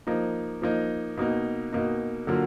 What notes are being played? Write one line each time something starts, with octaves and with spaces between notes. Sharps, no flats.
F3 A#3 D#4
F3 A#3 D#4
B2 A#3 D#4
B2 A#3 D#4
D3 F#3 A#3 F4